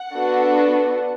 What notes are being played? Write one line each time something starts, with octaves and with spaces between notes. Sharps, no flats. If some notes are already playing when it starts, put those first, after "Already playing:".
Already playing: F#5
B3 D4 F#4 A4